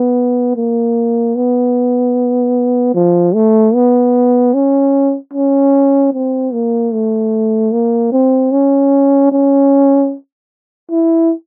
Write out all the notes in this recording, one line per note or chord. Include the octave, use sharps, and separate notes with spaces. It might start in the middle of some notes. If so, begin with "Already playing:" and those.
Already playing: B3
A#3
B3
F3
A3
B3
C#4
C#4
C4
A#3
A3
A#3
C4
C#4
C#4
E4